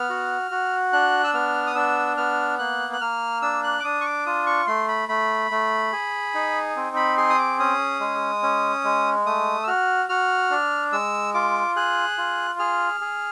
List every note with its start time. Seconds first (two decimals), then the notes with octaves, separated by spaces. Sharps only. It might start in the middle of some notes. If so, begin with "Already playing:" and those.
Already playing: B3 F6
0.09 F#4
0.51 F#4
0.93 D4 F#6
1.24 E6
1.34 B3 F6
1.67 D#6
1.75 D4 E6
2.17 B3 F6
2.59 A#3 F#6
2.93 F#6
3.01 A#3 F6
3.42 D4 E6
3.63 F#6
3.80 D6
3.84 D4 D#6
4.01 C#6
4.05 D6
4.26 F4 D#6
4.46 C#6
4.67 A3 C6
4.88 B5
5.09 A3 B5
5.51 A3
5.93 G#4
6.35 D#4
6.76 C4
6.96 B5
7.17 G#4 C6
7.30 D#6
7.38 D6
7.59 C#4 D#6
8.00 G#3
8.43 C#4
8.84 G#3
9.25 A3 D#6
9.64 E6
9.67 F#4 F6
10.09 F#4 F6
10.50 D4
10.92 G#3 E6
11.34 F4 D6
11.76 G#4 F#6
12.18 F4
12.59 G#4 F6
13.01 G#4